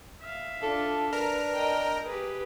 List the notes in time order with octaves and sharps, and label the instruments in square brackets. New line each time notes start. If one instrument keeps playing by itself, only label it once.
[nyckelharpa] E5 F5
[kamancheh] D4 F4 [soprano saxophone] A4
[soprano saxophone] D4 [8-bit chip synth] A#4 [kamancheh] B4
[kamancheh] D#5 A#5 [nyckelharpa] G5
[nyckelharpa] G4 G#4 [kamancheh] B4